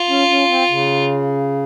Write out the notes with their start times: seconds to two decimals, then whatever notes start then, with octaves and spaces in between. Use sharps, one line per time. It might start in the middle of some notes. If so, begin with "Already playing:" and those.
Already playing: F4
0.09 C#4
0.29 C#4
0.49 C4
0.70 C#3